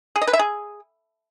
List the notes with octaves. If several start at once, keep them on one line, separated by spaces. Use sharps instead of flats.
G#4
D#5
B4
E5
G#4